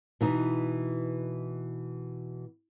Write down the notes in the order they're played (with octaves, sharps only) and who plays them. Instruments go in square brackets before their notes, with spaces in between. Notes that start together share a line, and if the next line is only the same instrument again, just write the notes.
[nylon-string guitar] B2 E3 D#4